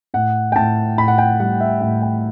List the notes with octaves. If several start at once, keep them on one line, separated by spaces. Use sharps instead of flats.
A2 F#5
G5
A2 A5
A2 B5
F#5
G5
G3 F#5
E5
A2 F#5
G5